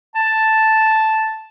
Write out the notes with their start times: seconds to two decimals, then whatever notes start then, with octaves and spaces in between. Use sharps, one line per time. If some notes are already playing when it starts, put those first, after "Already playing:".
0.15 A5